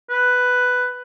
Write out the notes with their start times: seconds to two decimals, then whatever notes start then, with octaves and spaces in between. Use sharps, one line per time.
0.10 B4